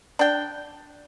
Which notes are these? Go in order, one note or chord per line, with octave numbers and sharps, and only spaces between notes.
D4 G5